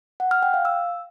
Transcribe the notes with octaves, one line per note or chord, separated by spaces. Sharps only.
F#5
F6
G5
F5
E6